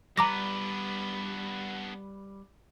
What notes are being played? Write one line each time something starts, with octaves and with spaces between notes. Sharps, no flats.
G3 B3 D4 B4 A#5 D6 A#6